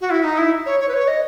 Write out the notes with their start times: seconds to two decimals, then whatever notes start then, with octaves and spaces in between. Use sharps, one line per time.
0.01 F#4
0.10 E4
0.24 D#4
0.38 E4
0.66 C#5
0.80 C#5
0.88 B4
0.94 C#5
1.08 D#5